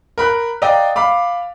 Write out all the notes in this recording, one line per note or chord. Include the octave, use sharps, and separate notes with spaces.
A#4 B5 F#6
D5 D#5 F5 G5 A#5
F5 B5 D6